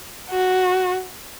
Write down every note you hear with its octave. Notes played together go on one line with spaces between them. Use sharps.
F#4